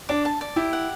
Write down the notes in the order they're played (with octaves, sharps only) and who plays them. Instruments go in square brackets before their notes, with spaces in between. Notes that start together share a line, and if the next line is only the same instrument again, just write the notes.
[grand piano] D4 [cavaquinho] D6
[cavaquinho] A5
D5
[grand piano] E4 [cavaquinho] G4
[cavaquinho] F#5